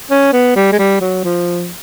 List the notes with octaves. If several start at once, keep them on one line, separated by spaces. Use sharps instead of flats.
C#4
B3
G3
G#3
G3
F#3
F3